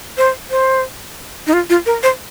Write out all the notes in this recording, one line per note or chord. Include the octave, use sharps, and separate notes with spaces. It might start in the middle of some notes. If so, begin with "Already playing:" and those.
C5
C5
D#4
F4
F4
A#4
C5